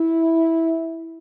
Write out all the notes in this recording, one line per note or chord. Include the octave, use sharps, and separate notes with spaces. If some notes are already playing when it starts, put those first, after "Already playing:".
Already playing: E4